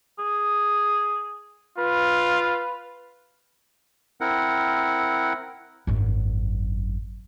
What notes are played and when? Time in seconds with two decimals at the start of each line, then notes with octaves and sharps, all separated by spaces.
0.19 G#4
1.78 F4 B4
4.21 C4 E4 A#4 F#5
5.87 G#1 F#2